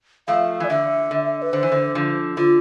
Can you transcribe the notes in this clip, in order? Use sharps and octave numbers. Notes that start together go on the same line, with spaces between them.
F3 A3 F5
E3 D5
D3 E5
D3
B4
D3 C5
E3
D3
D3 F3
D3 F4